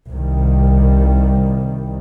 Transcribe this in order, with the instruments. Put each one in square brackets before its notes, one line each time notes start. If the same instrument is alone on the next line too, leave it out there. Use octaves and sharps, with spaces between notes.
[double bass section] C2 D#3 G3